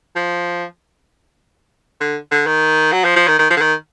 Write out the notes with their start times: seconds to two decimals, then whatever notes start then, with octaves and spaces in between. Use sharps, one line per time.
0.16 F3
2.01 D3
2.31 D3
2.47 D#3
2.92 F#3
3.04 F3
3.16 F3
3.28 D#3
3.39 D#3
3.50 F3
3.57 D3
3.61 D#3